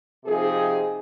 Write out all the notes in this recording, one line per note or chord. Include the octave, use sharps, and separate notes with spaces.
C3 F3 C4 D#4 G#4